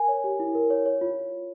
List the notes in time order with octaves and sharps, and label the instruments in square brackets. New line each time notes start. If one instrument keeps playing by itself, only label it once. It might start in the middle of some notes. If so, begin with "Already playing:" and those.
Already playing: [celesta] A#4 G#5
C#5
G4
E4
A#4
C#5
C#5
F4